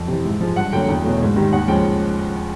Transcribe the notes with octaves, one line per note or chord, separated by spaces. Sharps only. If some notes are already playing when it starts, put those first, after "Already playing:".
Already playing: F2
C3 E3
G#2
F3 G#3
G2 F#5
D3 F#3 A#3 G5
E2 G5
B2 F#3 A3
G#2
D#3 G3
D#2 F#5
C#3 F3 G#3 G5